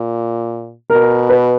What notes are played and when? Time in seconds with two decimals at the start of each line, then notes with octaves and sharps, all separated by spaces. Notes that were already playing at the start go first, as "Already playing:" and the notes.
Already playing: A#2
0.90 B2 A#4
1.29 B4